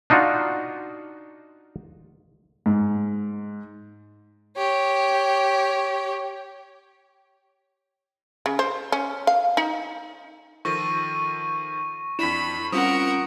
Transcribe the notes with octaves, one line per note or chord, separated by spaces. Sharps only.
D4 D#4 F4 F#4
G#2
G4 C#5
C#3
C5
C#4
F5
D#4
D#3 F3 A4 C#6 A#6 D#7
F2 D4 E4 B5 B6 E7
G3 C4 C#4 F4 A#4 F#5 D#6